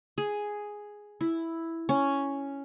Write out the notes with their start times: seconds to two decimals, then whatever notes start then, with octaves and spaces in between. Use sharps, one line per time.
0.18 G#4
1.21 E4
1.89 C#4